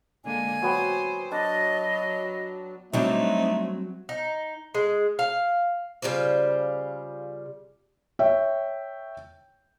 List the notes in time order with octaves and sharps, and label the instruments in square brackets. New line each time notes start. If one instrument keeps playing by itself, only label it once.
[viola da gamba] D3 G#3 A#3 [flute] G#5
[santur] F#3 B3 G5 [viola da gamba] C5
[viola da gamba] F#3 [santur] D4 A5 [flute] D#5
[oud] F#3 G3 D4 [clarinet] A3 [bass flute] C4 [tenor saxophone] D#4
[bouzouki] D#4
G#3
F5
C#3 G3 F4 C5
[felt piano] C#5 E5 G5